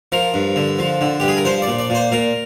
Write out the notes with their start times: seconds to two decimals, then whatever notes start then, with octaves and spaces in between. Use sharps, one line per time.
0.12 F3 A#4
0.34 G2
0.56 D3
0.79 F3
1.01 D3
1.20 G2 G4
1.28 G#4
1.37 A#4
1.45 F3 C5
1.62 D5
1.68 A#2
1.78 D5
1.90 A#2 C5
2.12 A#2 A#4